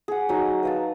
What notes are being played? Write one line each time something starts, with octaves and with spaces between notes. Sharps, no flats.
G#4 F#5
F#3 D#4 C#6
B4 F5 A5